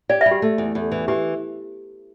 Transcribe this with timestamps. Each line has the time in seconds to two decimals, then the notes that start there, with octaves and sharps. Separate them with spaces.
0.09 G4 D5
0.21 E5
0.26 G3
0.31 G4
0.42 A3
0.58 E2
0.75 E2
0.92 E3
1.08 E3 G4